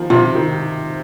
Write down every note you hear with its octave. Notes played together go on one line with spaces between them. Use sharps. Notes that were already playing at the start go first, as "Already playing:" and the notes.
Already playing: D#3 F3
C3 F4
D#3